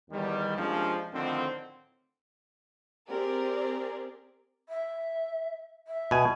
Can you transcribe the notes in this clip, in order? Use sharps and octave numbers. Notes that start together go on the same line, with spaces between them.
E2 D#3 G3
C3 F3 G#3 A#3 C#4 D4
A2 D3 D#3 F3 C4
C4 G4 G#4 A#4 D5
E5
E5
B2 G#5